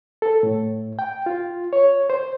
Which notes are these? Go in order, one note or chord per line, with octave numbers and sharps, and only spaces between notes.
A4
A2
G5
F4
C#5
C5